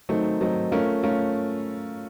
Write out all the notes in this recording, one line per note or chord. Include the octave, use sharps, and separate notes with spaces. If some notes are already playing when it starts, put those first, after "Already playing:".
D#3 F#3 A3 C4 D#4
D#3 F#3 A3 C4 D#4
A3 C#4 F4 A#4
A3 C#4 F4 A#4